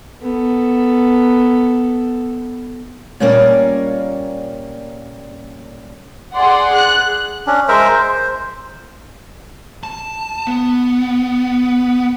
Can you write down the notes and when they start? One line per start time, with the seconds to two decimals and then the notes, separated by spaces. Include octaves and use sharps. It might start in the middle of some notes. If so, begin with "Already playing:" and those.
0.22 B3 A4
3.20 A#2 G3 A#3 C#4 D5
6.35 G#4 D5 F#5 C6
6.73 G#4 F#6
7.47 C#4 D4
7.68 G#3 A#4 C5 E5
7.95 C5
9.83 A5
10.47 B3